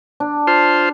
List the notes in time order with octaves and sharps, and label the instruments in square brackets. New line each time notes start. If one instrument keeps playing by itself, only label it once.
[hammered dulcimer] D4
[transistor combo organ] F4 C5